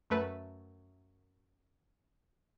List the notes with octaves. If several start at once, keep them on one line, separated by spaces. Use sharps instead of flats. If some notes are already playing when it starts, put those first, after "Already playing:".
F#2 A3 B4